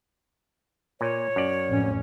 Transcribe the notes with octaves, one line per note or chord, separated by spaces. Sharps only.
A#2 C#5
F#2 D5
A1 F2 C#4